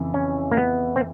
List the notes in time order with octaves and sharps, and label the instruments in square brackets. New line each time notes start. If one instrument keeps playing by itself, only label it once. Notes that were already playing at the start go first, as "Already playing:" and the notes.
Already playing: [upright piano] F2 C#3 E3
[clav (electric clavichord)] C#4
A#3
B3
C4